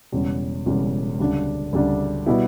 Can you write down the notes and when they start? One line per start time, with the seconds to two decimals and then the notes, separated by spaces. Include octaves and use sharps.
0.12 E1 E2 C#3 G3 C#4
0.66 E1 E2 C#3 G3 C#4
1.20 D2 C#3 G3 D4
1.73 D2 C#3 G3 D4
2.26 B2 G3 B3 E4